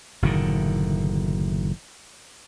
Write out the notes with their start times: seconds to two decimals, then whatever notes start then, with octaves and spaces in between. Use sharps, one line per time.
0.22 F#1 A2 D3 D#3